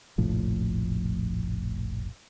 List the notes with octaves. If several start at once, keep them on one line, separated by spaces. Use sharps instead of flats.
F1 A#1 A2 F3